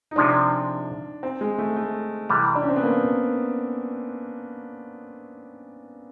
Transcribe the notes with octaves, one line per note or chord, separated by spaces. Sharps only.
D#4
C3 F3 G#3 D4
C4
G#3
A3
A3
C3 E3 G3
D4
C#4
C4
B3
A#3